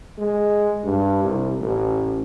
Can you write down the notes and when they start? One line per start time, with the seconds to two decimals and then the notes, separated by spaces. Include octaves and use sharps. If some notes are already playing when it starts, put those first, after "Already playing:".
0.18 G#3
0.84 G2
1.23 C2
1.60 A1